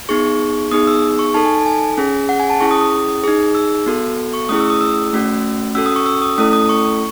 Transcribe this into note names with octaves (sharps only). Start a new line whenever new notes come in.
B3 D#4 G#4 C#6
B3 D#4 G#4 D#6
E6
C#6
D#4 A4 A5
G#5
A5
G#5
C#4 G#4
F#5
G#5
A5
C#4 E4 G#4 C#6
D#6
D#6
D#4 G#4
E6
B3 F#4 A4
C#6
A3 C#4 E4 G#4 D#6
E6
D#6
E6
A3 C#4 F#4
C#4 F#4 A4 E6
D#6
C#6
E6
D#6
A3 C#4 E4 A4 D#6
D#6
C#6